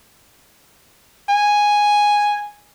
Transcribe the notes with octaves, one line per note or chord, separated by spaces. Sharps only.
G#5